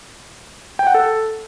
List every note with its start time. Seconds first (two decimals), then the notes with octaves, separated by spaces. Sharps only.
0.79 G5
0.87 F#5
0.94 A4